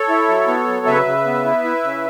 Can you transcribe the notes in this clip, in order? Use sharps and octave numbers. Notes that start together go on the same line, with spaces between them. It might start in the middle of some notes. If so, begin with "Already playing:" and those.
Already playing: A4 C#5
E4
F#3
B3
F#3
C#3 B4 E5
C#3
B3
E4
E4
C#3